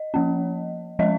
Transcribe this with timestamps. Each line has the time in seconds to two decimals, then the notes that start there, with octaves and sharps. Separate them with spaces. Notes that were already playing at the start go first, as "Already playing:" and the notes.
Already playing: D#5
0.14 F3 A#3 C#4
0.99 F3 G#3 C#4 D#5